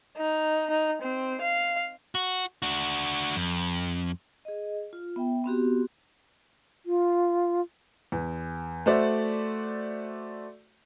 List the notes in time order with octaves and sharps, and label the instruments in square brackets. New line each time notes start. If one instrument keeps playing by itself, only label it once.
[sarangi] D#4
D#4
C4
F5
[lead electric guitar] F#4
D4 F#4
F2
[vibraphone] G#4 D#5
F4
B3 E5 G5
B3 C4 F#4 G4
[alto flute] F4
[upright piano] E2
A3 F#4 C5 D5 E5